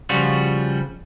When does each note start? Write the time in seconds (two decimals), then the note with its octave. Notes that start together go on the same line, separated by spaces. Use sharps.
0.09 C#3 F3 G3 F4 F#4